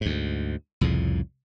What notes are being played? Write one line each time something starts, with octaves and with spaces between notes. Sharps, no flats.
D2 G#2
C2 F2 A2 C#3